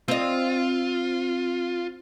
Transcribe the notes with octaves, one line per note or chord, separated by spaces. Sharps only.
C4 F4 D#5